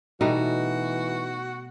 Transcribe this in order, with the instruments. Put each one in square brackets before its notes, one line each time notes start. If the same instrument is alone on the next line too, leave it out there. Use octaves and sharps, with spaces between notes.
[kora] B2 G3 A3 [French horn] E3 [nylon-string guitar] D#4 [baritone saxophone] F#4